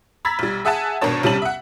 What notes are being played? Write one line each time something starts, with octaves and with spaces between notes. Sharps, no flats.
A#5 B5 E6 G#6 A6 B6
B1 G3
G#4 E5 F#5 G#5 A5
G#1 B2 D4 A#4 C#5 A5
B1 C3 G3 C#4 A5 F#7
E5 F#5